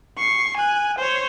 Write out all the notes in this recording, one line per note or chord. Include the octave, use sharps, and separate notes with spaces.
C#6 C7
G#5 F#6
C5 C#5